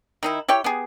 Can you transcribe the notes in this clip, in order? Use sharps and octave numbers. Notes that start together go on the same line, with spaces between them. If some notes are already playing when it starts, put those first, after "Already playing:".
D#3 D#4 E4
E4 G4 C#5 G5
B3 G4 G#4